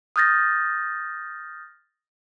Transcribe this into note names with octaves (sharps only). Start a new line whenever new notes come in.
D#6 F6 G6 A6 A#6